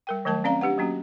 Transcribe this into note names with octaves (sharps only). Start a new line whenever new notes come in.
G3 A#4 G5
D#3 F#3 A3 A#4 A5
C4 C#4 D5 F5 A#5
D4 G4 B4 F#5
F#3 A#3 C#4 F#4